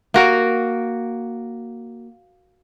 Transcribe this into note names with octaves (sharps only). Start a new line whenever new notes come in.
A#3 F#4 A#4